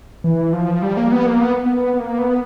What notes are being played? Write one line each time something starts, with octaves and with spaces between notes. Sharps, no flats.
E3
F3
G3
A#3
B3
A#3
B3
B3
B3
A#3
B3